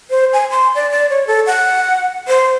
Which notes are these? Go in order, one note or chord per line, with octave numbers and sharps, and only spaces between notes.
C5
G#5
C6
D5
D5
C#5
A4
F#5
C5